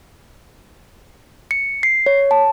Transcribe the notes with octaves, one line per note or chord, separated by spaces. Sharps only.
C#7
C7
C#5
A5